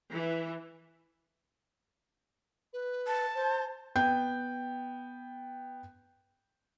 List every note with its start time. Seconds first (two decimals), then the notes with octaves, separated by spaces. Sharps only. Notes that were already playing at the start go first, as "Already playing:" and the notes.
0.12 E3
2.73 B4
3.07 A5
3.35 C5
3.96 B3 G5 G6